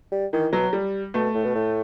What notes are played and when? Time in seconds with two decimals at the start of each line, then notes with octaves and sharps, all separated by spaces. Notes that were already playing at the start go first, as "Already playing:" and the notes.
0.12 G3
0.33 D#3 E3
0.52 B2 F#3
0.73 G3
1.14 B2 A3
1.35 A2
1.44 B2
1.55 A2